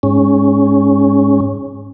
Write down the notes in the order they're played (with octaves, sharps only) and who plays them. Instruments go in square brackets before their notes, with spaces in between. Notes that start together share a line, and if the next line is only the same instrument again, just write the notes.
[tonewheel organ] G#2 C#4